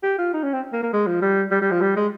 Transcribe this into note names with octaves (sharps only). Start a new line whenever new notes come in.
G4
F4
D#4
C#4
C4
A#3
A#3
G#3
F3
G3
G3
G3
F3
G3
G#3